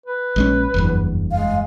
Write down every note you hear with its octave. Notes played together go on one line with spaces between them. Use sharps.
B4
A#1 G#3 C#4
F#1 E2 G2
G#3 F5